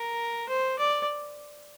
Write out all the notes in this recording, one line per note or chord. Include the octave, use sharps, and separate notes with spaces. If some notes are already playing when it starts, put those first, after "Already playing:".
Already playing: A#4
C5
D5